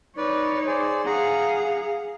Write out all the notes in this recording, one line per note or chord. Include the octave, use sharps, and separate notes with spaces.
D#4 B4 C#5 D5
G#4 C5 D5
G#4 F5 F#5 A#5